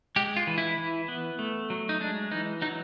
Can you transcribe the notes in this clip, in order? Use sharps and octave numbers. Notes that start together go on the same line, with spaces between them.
G#3 G4
F4
E3
E4
E3
B3
A3
F#3
D#4
G#3 D4
E3 D#4
F#3 D#4